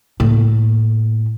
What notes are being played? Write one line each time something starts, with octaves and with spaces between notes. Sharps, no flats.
A2 A#3